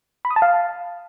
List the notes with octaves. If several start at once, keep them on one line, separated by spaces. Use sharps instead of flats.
B5
D#6
A5
F5